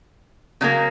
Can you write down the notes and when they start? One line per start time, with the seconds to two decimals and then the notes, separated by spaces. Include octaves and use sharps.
0.61 C#3 F#3 A#3